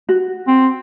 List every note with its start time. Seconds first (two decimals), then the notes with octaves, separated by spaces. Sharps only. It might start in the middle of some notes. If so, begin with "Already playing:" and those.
0.09 F#4
0.48 C4